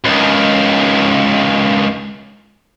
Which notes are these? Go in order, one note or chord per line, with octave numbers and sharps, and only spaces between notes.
C#2 D#3